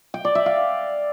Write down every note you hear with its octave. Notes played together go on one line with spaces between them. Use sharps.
G5
D5
E5
F5